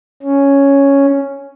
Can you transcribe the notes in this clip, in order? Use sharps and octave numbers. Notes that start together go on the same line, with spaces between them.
C#4